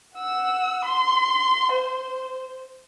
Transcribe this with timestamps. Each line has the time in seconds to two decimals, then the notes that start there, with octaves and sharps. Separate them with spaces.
0.17 F#5 E6
0.84 C6
1.74 C5